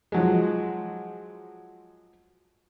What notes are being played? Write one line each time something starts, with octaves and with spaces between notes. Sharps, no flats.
F3 F#3 G#3